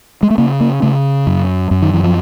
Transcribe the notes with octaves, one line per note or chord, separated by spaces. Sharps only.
G#3
A3
C#3 A#3
A#3
C#3 A3
F#2
F#2
D#3
E3
F3